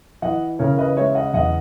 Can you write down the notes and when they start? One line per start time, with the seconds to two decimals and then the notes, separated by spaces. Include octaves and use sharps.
0.22 E3 D#5 F#5
0.59 C#3 A#4 C#5
0.78 B4 D#5
0.97 G#3 C#5 E5
1.15 D#5 F#5
1.34 E2 D#5 F#5